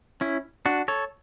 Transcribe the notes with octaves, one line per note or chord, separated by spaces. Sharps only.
C#4 E4
D4 F#4
A4 C#5